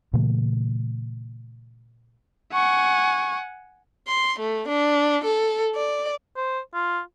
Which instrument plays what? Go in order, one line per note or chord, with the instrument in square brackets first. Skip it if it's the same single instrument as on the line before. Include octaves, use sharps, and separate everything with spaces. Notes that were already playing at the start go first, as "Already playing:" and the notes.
[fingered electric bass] A#2 C#3 E3 A3
[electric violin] F#5 G#5 [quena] C#6
[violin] C6
A3
D4
A4
D5
[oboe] C5
F4